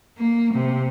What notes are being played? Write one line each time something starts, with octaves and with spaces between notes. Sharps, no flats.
A#3
C3